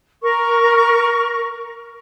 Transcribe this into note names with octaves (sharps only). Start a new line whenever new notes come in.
A#4 C#6